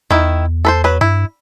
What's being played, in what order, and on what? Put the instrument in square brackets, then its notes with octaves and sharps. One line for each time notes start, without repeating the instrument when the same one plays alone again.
[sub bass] E2 [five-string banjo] D#3 E4
[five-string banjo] A4 B4 C5
F#3 B4
[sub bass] G2 [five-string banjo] E4